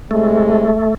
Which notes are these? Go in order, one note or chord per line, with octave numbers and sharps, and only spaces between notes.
A2 C3 G#3 A3